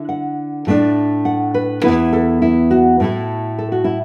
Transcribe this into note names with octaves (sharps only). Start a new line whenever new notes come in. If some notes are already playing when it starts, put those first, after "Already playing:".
Already playing: D3 E4
F#5
A2 A3 D4
F#5
B4
E2 E3 B3 E4 B4
A4
E4
F#4
A2 A3 E4
A4
F#4
E4